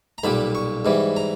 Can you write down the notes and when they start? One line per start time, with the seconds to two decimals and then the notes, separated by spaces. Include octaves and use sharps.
0.18 A#5
0.24 B1 A#2 G3 B5
0.55 C#6
0.85 G#2 E3 G3
1.16 A#5